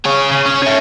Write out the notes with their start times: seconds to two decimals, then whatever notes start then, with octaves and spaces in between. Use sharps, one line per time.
0.06 C#4 G#4
0.31 C#3
0.46 C#4
0.63 C#5 E5